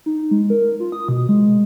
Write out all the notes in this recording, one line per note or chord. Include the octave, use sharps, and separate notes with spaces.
D#4
G#3
A#4
F4
D#6
B2
G#3